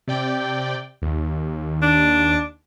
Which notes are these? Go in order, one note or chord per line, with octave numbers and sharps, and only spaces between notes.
C3 D5 G5
D#2
D4